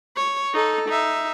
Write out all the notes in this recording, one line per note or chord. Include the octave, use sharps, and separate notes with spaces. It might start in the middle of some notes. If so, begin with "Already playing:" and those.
C#5
D#4 A4
D#4 E5